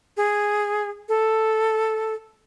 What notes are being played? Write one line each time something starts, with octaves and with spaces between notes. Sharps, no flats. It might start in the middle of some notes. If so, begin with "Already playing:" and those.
G#4
A4